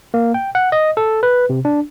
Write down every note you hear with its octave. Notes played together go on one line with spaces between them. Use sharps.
A#3
G5
F#5
D#5
A4
B4
C3
D4